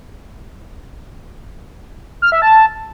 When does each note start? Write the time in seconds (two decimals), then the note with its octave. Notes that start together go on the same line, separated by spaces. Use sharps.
2.22 F6
2.32 E5
2.42 A5